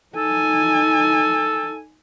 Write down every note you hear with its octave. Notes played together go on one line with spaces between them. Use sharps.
D#4 A4 G#5